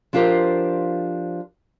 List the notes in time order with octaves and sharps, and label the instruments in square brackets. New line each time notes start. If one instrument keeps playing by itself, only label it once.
[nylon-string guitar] F3 D4 F4 G4 A#4 C5